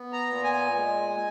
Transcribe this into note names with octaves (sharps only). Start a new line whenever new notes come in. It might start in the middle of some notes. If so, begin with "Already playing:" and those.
Already playing: B3
A#5
A#2
G#5
G#3